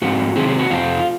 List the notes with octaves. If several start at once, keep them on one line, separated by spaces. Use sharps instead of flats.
G#2 F3 C4 F#4
C3 D#3 F#3 C4 G#4
G#4
F#4
F2 C3 F3 C4 F4